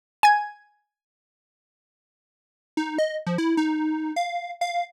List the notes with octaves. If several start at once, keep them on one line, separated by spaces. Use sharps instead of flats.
G#5 G#6
D#4
D#5
F3
E4
D#4
F5
F5